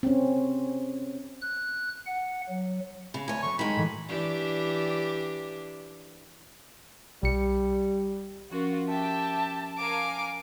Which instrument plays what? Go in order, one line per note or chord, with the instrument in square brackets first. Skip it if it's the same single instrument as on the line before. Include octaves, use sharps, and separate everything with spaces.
[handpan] C4 C#4
[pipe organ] F#6
F#5
F#3
[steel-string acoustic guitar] C#3 [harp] B5 A#6
[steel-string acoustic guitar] D2 C#5 [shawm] G#5
[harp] F#3 A3 [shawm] C#6
[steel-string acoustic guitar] D#3 G#3 [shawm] B5
[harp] A2 E3 A3
[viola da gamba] E3 D4 G4
[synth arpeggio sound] B1 C#7 [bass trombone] G3
[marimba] F3 C#4 A#4 [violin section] F4 F#4
[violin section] G4 E5 G5 [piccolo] A5
[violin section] A#4 F5 G#5 [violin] D6